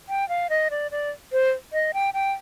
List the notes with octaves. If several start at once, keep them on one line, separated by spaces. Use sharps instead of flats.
G5
F5
D#5
D5
D5
C5
D#5
G5
G5